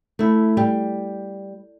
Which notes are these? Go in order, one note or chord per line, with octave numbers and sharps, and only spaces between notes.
A3 E4
G3